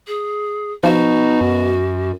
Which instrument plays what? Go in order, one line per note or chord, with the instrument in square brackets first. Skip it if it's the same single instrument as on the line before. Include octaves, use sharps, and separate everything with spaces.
[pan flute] G#4
[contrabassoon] B2 [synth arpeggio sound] F3 [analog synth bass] D#4 [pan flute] F#4
[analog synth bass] F#2